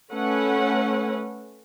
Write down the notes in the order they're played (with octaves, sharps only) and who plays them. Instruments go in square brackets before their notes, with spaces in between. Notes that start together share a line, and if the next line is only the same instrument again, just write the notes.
[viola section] A3 C#4 B4 F#5